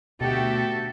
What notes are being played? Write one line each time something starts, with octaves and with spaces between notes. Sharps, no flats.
D2 B2 F#4 G4 A4 E5 G5